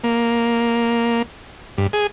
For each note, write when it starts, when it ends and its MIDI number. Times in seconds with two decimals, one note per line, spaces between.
0.04 1.22 58
1.78 1.87 43
1.93 2.07 68